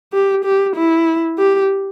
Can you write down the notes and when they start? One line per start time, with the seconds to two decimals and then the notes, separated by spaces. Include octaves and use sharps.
0.13 G4
0.45 G4
0.76 E4
1.38 G4